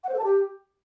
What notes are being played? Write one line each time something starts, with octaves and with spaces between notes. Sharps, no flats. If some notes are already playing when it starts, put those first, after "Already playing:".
F#5
C5
A4
A5
G4